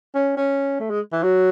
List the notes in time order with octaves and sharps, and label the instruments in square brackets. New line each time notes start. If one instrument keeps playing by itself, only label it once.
[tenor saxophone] C#4
C#4
A3
G#3
E3
F#3